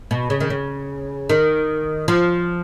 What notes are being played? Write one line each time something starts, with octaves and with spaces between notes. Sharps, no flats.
B2
C#3
D#3
C#3
D#3
F3